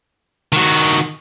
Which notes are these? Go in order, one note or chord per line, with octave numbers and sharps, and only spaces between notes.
D#3 F#4